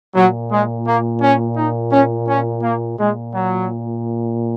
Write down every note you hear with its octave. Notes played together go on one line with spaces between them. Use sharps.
A#2 F#3
G#3
A#3
C#4
D#4
C#4
C#4
A#3
A#2 G#3
F#3